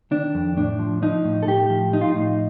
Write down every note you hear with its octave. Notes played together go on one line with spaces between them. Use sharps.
D#3 D4
F2
A2 D4
F3
F3 D#4
A2
A4
A2 G4
F3
F3 D#4
F4
D#4
A2